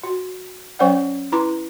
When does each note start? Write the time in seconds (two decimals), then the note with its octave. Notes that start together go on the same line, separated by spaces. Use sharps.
0.04 F#4
0.79 F#3 C#4 C5 D5 F#5
1.32 E4 B4 A#5 C6 D6